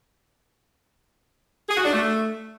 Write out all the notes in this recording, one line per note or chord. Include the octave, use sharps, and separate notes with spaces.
G#4
F#4
D4
A3